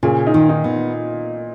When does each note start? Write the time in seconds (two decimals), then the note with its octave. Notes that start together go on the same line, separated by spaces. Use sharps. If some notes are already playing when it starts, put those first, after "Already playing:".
0.03 A#2 C#3
0.27 D#4
0.34 D#3
0.49 D#4
0.64 B3